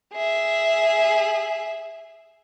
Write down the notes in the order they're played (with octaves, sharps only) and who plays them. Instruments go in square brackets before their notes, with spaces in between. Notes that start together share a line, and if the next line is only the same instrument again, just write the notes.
[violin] G#4 E5